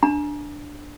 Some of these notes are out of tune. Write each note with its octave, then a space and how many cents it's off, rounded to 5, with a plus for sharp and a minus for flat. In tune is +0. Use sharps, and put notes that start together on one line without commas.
D4 +0 A#5 +30